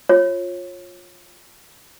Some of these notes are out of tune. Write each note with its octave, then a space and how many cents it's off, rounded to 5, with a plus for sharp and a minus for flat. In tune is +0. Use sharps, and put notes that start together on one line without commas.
F4 +10 C#5 -25